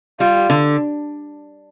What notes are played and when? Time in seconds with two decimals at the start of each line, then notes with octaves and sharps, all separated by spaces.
0.20 G3 F4
0.50 D3